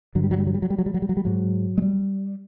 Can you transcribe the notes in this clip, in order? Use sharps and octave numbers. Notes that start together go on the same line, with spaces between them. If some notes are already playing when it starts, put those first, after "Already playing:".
G2 D3 F#3
G3
F#3
G3
F#3
G3
F#3
G3
F#3
G3
F#3
G3
F#3
G3
G#2 F#3
G#3
G3